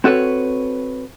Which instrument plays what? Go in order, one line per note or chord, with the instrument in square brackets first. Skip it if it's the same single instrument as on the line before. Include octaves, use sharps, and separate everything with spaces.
[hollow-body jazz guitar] C4 F#4 A4 B4 C#5